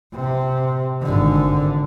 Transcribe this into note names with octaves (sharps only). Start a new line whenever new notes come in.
C3
G#1 D3